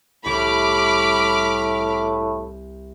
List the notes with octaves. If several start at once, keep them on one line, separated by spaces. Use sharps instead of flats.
C2 A2 B5 D6 F6